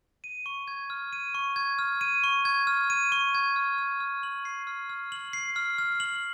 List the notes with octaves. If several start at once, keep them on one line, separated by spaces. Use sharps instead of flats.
D#7
C#6
G#6
F6
D#7
C#6
G#6
F6
D#7
C#6
G#6
F6
D#7
C#6
G#6
F6
F6
F6
F#7
C7
F6
F6
F#7
C7
F6
F6
F#7